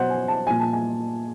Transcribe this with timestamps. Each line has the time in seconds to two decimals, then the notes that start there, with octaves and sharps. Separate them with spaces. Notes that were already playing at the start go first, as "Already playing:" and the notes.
Already playing: B2 F#3 C5 F#5
0.10 G#5
0.28 A5
0.47 A#2 F3 G#5
0.60 A5
0.73 G#5